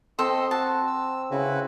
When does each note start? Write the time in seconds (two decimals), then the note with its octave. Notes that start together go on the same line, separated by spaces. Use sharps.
0.19 C4 A4 D#5 C6
0.51 F#4 A5
0.87 E6
1.31 C#3 E4 F#4 B4